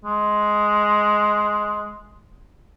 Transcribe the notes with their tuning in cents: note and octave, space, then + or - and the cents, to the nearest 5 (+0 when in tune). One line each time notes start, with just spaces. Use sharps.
G#3 +10